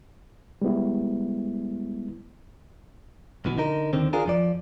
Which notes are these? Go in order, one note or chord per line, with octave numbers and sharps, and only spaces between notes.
G3 G#3 B3 E4
B1 B2 E3
D3 D#4 A#4
D#2 D3 D#3 C4
D4 F4 G#4 A#4
F2 F3 D5